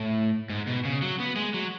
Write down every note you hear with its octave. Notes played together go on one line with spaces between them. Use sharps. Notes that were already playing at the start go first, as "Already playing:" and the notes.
Already playing: A2
G#2
B2
C#3
F#3
B3
G#3
F#3